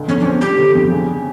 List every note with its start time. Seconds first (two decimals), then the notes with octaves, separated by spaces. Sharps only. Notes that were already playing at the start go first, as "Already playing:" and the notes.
Already playing: C#2 D3
0.08 F2 C#4
0.20 D4
0.25 C4 C#4
0.41 G3 G4
0.58 D3
0.75 F2
0.91 C#3